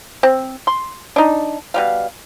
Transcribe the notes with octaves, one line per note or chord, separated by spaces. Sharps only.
C4
C6
D4 D#4
B2 G3 F5